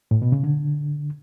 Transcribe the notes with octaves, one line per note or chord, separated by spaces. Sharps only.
A2
B2
C#3
D3